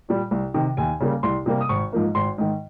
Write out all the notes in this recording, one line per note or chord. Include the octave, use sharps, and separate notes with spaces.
A#2 G3
C2
C3 D#3
D#2 G#5
C#3 G3 A#3
C2 C6
C3 G3 A#3
D#6
G#1 C#6
G#2 F3 A#3
G#1 C6
G#2 D#3